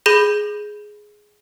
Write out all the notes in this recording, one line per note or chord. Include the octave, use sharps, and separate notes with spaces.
G#4 B5 G6 A#6 D#7 G7